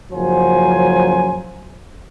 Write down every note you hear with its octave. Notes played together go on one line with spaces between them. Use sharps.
F#1 F#2 F3 F#3 C5 G#5